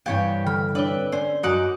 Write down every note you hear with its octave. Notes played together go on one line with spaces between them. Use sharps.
G2 C3 E3 G4 C#5 F5 G5
D3 B5 F6
D4 B4 C#5 D5 E5 G7
C#4 C5 D5
F#2 F#3 D#4 F#4 F#5 D6